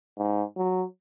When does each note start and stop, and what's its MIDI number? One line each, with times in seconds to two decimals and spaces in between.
0.18 0.43 44
0.57 0.84 54